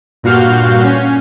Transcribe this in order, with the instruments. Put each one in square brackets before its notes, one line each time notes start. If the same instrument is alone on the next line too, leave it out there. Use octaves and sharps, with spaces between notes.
[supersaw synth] G2 A#2 F#4 F5 F6 G6
C#4